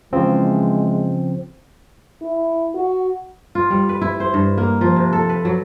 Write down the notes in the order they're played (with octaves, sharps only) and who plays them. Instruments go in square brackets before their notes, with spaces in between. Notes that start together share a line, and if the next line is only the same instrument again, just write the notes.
[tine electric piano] C#3 F3 C4 [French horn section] E3 G#3
[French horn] E4
F#4
[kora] F4
G3
B4
E4
C5
G2
A#3
F3
C3
A4
B4
F#3